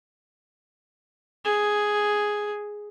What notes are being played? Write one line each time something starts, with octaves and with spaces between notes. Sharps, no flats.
G#4